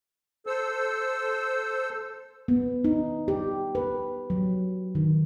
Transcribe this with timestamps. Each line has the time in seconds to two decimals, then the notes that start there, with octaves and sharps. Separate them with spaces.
0.47 A4 C5 E6
2.48 B3
2.85 D#4
3.28 G4
3.75 B4
4.30 F#3
4.95 D#3